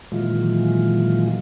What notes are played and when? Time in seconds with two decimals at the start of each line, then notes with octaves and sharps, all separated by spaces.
0.12 A#2 D#3 E3 F#3 G#3 F4